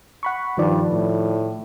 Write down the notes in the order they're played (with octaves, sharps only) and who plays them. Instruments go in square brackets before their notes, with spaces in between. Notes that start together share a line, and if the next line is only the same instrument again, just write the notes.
[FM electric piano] F#5 B5 C#6
[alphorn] G2 [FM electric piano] D#3 F3 D5
[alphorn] A2